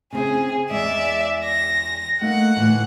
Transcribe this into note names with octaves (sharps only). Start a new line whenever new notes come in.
C#3 C4 E4 G#4
E2 G#3 D5 E5
A#6
A3 A#3 D#4 F#5
D2 A2 E3